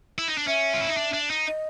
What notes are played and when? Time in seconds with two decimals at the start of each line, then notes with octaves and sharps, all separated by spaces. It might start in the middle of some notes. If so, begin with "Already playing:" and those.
0.18 E4
0.28 D#4
0.38 D4
0.47 C#4 E5
0.73 F4
0.81 E4
0.89 D#4
0.97 D4
1.13 D4
1.30 D#4
1.47 D#5